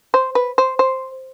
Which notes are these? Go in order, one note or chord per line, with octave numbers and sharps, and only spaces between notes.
C5
B4
C5
C5